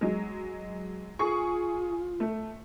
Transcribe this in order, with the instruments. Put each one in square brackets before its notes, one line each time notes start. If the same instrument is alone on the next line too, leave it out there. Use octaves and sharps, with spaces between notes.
[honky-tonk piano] F#3 G#3
[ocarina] F4 [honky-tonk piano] G#4 C#6
[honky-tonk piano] A3